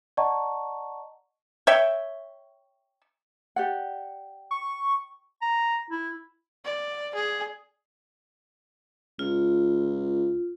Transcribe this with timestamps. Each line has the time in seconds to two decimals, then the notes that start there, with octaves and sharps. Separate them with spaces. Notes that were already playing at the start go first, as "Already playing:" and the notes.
0.17 D5 D#5 F#5 A5 A#5 C#6
1.67 C#5 E5 G5
3.56 G4 D5 F#5
4.51 C#6
5.42 A#5
5.90 E4
6.65 D5
7.15 G#4
9.19 C#2 F4